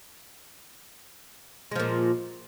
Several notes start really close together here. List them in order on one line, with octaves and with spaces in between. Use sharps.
G#3 F3 A#2